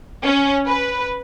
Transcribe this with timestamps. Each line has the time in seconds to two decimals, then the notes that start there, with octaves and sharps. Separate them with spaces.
0.25 C#4
0.66 B4